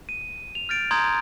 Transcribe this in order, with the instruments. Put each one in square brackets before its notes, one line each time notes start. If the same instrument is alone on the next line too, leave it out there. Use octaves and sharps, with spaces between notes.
[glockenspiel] D#7
F7
F6 G6 A6 D7
A#5 C6 D#6 G6 G#6